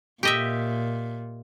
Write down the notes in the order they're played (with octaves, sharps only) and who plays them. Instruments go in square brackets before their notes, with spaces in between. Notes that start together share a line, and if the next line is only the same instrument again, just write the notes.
[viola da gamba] A#2 [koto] G4 D#5 E5